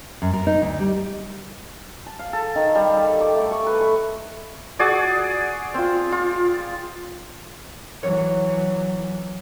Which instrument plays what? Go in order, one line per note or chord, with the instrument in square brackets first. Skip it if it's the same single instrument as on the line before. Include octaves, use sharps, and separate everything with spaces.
[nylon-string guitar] F#2
A#4
D#4
D2
G3
[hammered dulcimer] A5
F5
A4
D#3
G3
A4
D6
A3
C#6
B4
C#6
[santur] F#4 G#4 D5
C4 F4
F4
[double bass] E3 F#3 [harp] C#5